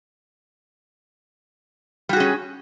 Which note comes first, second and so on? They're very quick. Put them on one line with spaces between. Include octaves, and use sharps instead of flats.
G3 F#4 G#4 C#4